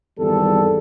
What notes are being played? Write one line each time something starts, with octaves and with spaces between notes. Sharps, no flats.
G#1 E2 G3 A4